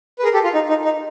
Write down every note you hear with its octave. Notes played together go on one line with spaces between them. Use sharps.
B4
G#4 A#4
G4 A4
F4
D#4
D#4
D#4